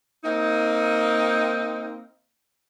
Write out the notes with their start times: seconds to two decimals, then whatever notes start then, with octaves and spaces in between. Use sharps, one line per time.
0.24 A#3 C4 D#4